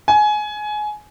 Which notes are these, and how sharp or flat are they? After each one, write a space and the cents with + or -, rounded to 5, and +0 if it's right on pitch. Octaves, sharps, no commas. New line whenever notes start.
G#5 +20